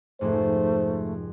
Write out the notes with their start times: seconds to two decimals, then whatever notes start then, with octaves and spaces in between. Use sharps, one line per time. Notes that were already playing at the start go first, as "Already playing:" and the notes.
0.21 F1 F2 G#2 A3 C5